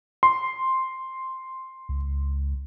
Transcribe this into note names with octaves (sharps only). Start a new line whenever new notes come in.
C6
C#2